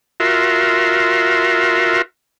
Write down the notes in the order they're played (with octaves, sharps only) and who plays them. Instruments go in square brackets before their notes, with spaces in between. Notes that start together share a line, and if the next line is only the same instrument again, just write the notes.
[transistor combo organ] F4 F#4 A#4 E5 C6